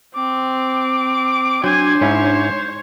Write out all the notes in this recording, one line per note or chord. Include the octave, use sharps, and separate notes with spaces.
C4 D6
F#3 D4 C5 G#5
G#2 C#4 E4 C#5